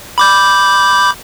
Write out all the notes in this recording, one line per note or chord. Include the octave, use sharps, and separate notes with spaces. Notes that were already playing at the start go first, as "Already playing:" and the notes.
B5 D6 G6